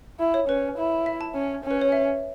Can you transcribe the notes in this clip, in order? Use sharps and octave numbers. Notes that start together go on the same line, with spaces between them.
E4
C#5
C#4 B4
E4
E5
A5
C#4
C#4
B4
C#5
E5